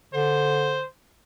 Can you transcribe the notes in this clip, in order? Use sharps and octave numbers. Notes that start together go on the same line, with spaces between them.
D3 C5